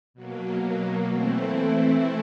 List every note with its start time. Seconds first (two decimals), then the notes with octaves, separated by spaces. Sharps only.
0.14 B2 F#3 A#3
1.08 E3 A3 C4 E4